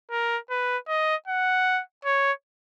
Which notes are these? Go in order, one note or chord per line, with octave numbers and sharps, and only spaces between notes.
A#4
B4
D#5
F#5
C#5